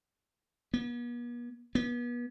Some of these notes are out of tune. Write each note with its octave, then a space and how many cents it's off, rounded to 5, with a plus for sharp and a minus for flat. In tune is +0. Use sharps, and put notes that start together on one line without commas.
B3 -45
B3 -35